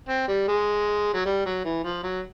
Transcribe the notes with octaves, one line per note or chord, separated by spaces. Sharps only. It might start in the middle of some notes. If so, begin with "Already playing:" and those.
C4
G3
G#3
F#3
G3
F#3
E3
F3
F#3